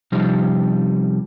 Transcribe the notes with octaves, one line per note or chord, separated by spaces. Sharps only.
C3 F3 G3 C#4 D#4 G4